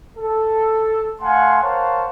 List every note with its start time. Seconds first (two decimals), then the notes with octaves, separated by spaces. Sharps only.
0.17 A4
1.22 A3 F5 F#5 G#5 A5 C6
1.61 A#4 C5 C#5 F5 F#5 A5